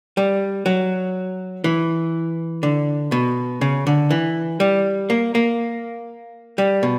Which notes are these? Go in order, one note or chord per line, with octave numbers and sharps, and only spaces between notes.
G3
F#3
E3
D3
B2
C#3
D3
E3
G3
A#3
A#3
G3
B2